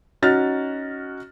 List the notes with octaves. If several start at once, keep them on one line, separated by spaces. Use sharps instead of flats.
C#4 D#4 F#4 F6 A6